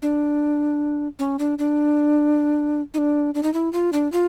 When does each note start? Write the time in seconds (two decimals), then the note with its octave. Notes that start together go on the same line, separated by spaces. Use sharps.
0.02 D4
1.19 C#4
1.39 D4
1.58 D4
2.94 D#4
2.98 D4
3.34 D4
3.43 D#4
3.54 E4
3.73 F4
3.93 D4
4.12 F4